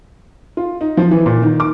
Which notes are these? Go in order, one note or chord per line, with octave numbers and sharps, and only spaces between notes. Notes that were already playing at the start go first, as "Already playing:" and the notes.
F4
D#4
F3
E3
A#2
D#3
D6